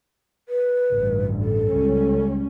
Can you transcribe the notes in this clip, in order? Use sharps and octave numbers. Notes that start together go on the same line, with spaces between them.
B4
A1 D2 G2
A4
C#2 G3 C#4